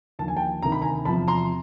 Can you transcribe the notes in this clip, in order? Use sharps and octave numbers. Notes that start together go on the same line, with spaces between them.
D#2 D3 F3 A5
G#5
G5 A5
D2 C3 D#3 A#5
B5
G#5 A#5
E2 C3 F3 A5 B5
A#5 C6